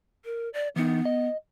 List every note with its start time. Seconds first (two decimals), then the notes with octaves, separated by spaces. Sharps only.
0.25 A#4
0.54 D5
0.76 E3 B3 D#4
1.05 D#5